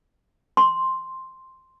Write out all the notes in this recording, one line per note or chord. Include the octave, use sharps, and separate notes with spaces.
C6